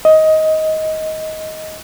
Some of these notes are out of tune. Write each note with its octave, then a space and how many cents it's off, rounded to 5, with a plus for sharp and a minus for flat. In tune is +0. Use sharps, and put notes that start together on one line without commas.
D#5 +15